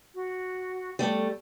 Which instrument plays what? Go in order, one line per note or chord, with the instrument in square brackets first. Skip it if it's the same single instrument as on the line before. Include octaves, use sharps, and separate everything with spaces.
[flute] F#4
[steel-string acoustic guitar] G3 A3 [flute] A4